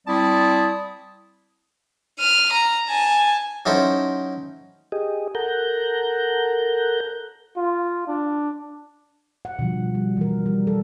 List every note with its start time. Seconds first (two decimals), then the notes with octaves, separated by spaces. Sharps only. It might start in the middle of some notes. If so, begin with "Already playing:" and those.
0.07 G3 C4 E4 D5 A5 D#6
2.19 F6 D#7
2.53 A#5
2.88 G#5 A5
3.66 F#3 C#4 D#4 E4 A4 C5
4.92 G4 G#4 D#5
5.35 A4 A#4 F#5 A#5 G6
7.57 F4
8.07 D4
9.45 F#5
9.59 B2 D3 F3 G3
9.95 G3
10.17 E3 G3 A#4
10.46 G3
10.67 A4